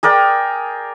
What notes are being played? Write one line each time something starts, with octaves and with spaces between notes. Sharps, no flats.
G#4 A#4 D5 G5